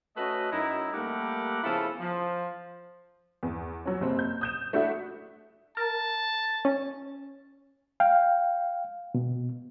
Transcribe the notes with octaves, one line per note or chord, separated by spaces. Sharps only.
A3 C#4 F#4 B4 D#5
F#2 D#4 E4
G3 A3 A#3 G4 A#4 F#5
C#3 F3 B3 E4 A4
F3
E2
F#3 C#4
F#1 C3 C4
G6
D#6 G6 E7
A3 D4 E4 F#4 E5
A#4 A5
C#4
F5 G5
B2